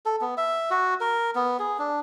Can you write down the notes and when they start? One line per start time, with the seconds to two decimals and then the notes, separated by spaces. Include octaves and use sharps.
0.06 A4
0.21 B3
0.38 E5
0.70 F#4
1.01 A#4
1.35 B3
1.59 G#4
1.79 D4